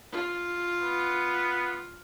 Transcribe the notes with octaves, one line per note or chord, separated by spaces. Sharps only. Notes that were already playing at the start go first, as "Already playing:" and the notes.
F4
B3